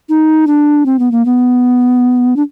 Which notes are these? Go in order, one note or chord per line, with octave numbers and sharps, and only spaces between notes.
D#4
D4
C4
B3
A#3
B3
D4